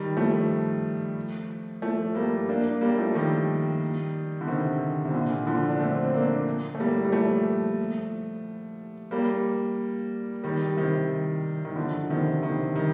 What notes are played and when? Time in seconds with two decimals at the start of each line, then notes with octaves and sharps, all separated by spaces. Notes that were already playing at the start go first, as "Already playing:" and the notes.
Already playing: D#3 G3
0.17 F3 A3
1.82 F3 A3
2.15 G3 A#3
2.49 A#3 D4
2.81 G3 A#3
2.98 F3 A3
3.14 D#3 G3
4.41 D3
4.47 C3 D#3
5.05 C3
5.14 A#2 D3
5.47 D3 F3
5.69 D4
5.79 A3 C4
6.04 C4
6.13 A#3 D4
6.75 A3
6.80 G3 A#3
7.05 G3
7.12 F3 A3
9.11 G3 A#3
10.44 D#3 G3
10.77 C3 D#3
11.65 D#3
11.76 D3 F3
12.10 C3 D#3
12.43 C3 D#3
12.75 D#3 G3